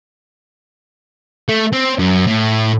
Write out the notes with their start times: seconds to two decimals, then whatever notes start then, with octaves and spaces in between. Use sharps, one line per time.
1.48 A3
1.73 C4
1.99 F#2
2.27 A2